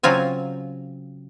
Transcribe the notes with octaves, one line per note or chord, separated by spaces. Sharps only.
C#3 F#3 C4 F4 G#5